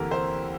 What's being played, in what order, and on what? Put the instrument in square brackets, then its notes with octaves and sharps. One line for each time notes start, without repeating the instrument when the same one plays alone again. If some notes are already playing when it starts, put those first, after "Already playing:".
Already playing: [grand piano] D2 C3 E3 A#3 [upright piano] G4 A4 A#4
[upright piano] C5